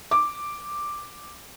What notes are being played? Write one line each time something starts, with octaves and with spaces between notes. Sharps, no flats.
D6